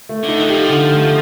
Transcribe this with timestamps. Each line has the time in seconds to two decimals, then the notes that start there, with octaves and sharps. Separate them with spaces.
0.09 A3
0.23 D3
0.28 D#4
0.40 D#3
0.49 F3 G4
0.69 D3
0.90 A3